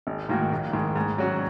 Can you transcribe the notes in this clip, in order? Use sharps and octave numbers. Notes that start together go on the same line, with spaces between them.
G#1
G#2 D#3 A#3 F#4
A#1
G#2 D#3
G#2
F#3 C#4 F#4